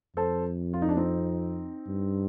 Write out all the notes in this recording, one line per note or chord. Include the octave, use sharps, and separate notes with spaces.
F2 A4 C5
F4
D#4
D4
C4 D#4
G2